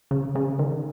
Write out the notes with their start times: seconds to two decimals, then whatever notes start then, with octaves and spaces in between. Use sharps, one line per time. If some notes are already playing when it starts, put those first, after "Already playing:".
0.11 C#3
0.35 C#3
0.59 D#3